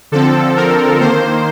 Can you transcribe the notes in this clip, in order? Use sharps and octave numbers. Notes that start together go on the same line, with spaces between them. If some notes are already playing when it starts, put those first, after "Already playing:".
D3 F3 C4 A4
A#4
D#3 A#3 C5